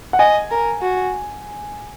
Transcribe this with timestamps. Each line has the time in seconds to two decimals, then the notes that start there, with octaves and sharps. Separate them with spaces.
0.13 F#5
0.19 D#5 G#5
0.51 A#4
0.82 F#4